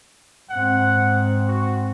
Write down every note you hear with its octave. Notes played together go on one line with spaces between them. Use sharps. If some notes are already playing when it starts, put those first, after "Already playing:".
G#2 C4 F#5
F#4